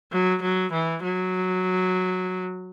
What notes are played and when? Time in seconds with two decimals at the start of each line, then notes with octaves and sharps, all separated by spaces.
0.12 F#3
0.42 F#3
0.72 E3
1.03 F#3